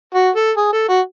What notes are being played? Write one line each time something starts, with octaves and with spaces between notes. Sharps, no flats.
F#4
A4
G#4
A4
F#4